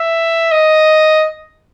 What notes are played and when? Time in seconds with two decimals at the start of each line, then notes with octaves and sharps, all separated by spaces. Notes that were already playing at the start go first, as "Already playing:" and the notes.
Already playing: E5
0.51 D#5